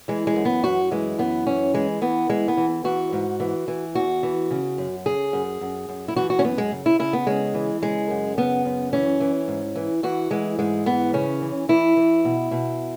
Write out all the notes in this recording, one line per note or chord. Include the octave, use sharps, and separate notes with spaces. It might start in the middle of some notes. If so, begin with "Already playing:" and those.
E3 G#3
G#3
F#2
B3
F#2 F#4
E3 G#3
F#2 B3
E3 C#4
E3 G#3
E3 B3
E3 G#3
B3
E3
E3 F#4
G#2
E3
E3
E2 F#4
E3
C#3
F#2
C#3 G#4
F#2
F#2
F#2
E4
E3 F#4
F#4
C#4
F#2 B3
G#3
C#3
E4
C#3 E4
B3
C#3 G#3
E3
C#3 G#3
F#2
C#3 B3
F#2
E3 C#4
E3
G#2
E3
E3 F#4
E3 G#3
G#2 G#3
E3 B3
C#3 C#4
E3
E3 E4
E3
B2
B2